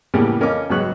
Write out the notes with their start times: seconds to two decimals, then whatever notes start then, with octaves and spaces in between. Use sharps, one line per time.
0.14 A2 C#3 E3 G3 A#3 B3
0.40 F2 C#4 A#4 D#5 F5 D6
0.70 G#1 C#3 F#3 B4 C#6 F#6